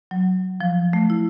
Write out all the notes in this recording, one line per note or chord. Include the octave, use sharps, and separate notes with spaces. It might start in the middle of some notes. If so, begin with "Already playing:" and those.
F#3
F3
A3
E4